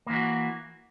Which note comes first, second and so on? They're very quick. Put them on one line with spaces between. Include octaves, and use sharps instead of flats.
A#3 E3 F#4